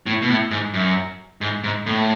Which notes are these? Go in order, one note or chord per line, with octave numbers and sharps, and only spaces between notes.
A2
B2
A2
G#2
F#2
G#2
G#2
A2